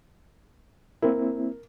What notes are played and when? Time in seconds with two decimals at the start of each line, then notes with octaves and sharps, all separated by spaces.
1.02 A#3 C4 E4 A#4